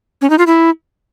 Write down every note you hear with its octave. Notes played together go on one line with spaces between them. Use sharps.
C#4
D#4
F4
E4